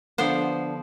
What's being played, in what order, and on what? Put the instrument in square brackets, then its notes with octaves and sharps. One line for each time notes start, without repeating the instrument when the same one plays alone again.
[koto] D3 F3 B3 C5